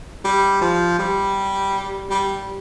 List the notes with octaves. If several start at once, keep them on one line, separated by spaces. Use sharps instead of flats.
G3
F3
G3
G3